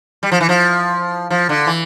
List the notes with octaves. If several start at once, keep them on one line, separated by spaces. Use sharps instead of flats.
G3
F3
E3
F3
F3
D3
E3